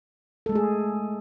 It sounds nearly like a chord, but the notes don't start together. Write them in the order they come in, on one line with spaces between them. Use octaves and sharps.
A4 G#3 A3 G#4